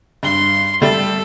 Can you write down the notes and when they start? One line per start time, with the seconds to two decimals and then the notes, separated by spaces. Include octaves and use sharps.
0.23 G2 C6 G7
0.82 G3 A3 A4